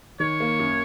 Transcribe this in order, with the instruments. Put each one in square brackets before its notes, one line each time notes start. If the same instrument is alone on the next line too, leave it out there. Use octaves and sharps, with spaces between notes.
[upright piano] D#3 [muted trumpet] C#5
[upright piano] A#3
F#2